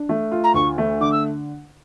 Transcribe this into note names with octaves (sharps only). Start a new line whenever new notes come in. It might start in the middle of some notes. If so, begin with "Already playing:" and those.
Already playing: D4
A3
F4
A#5
D2 C#6
A3
D3 D6
E6